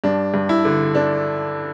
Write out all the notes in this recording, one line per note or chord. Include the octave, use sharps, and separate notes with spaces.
G2 D4
G2
E4
D3
D3 D4